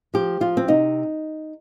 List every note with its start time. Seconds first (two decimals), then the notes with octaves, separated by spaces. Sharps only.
0.14 F3 G4
0.40 F3 F4
0.57 C4
0.68 C3 D#4